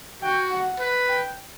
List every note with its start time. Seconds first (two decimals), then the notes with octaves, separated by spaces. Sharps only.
0.22 F#4 G5
0.51 F#5
0.79 B4
1.09 G5